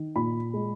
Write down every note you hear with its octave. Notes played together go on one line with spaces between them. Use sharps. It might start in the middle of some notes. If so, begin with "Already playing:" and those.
Already playing: D#3
A#2 B5
G#3